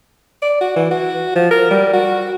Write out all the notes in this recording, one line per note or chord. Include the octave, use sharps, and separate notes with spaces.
D5
F#4
E3
F#4
F3
A#4
G3
F#4